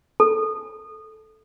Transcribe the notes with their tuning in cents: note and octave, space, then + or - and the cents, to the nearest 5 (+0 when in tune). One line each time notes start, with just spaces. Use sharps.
A4 -10